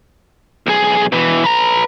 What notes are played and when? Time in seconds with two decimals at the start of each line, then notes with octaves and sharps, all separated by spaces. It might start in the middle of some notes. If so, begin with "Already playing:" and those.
0.67 B1 G#4
1.12 B2 E3
1.44 B4 A#5